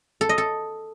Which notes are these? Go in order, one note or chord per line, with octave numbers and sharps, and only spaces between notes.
A4
D#5
A4